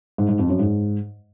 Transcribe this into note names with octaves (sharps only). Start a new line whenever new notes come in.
G#2
G#2
F2
F#2
G#2